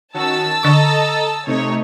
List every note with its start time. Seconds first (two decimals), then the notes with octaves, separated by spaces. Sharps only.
0.14 D#3 C#4 F#4 A5 E6 A6
0.63 D3 A4 D#5 A#5 C#6
1.47 C3 A3 D#4 C#5